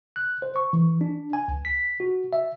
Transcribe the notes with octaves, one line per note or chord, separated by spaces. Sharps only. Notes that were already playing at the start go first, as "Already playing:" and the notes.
F#6
C5
C#6
E3
D4
G#5
C#2
B6
F#4
E5